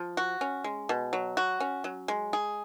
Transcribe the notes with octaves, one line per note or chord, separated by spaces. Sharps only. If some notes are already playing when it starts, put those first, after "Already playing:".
Already playing: F3
F#4
C#4
G#3
B2
F#3
F#4
C#4
F#3
G#3
G#4